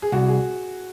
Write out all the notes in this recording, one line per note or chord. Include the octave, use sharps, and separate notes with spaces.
G#4
C2 F#4
G#4